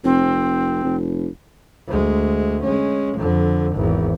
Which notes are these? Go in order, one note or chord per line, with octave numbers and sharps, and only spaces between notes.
F1 C4
F1
D2 G#3
G#3 C#4
F2 D3
G#1 E2